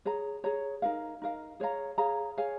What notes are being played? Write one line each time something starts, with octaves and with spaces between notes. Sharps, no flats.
G#4 C#5 A#5
G#4 C#5 A#5
D#4 A#4 F5
D#4 A#4 F5
G#4 C#5 F5 A#5
G#4 C#5 F5 A#5
G#4 C#5 F5 G#5